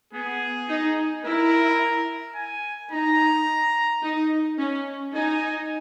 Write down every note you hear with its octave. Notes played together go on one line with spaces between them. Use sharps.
B3 G#4
D#4
E4 A#4
G#5
D#4 A#5
D#4
C#4
D#4 G#5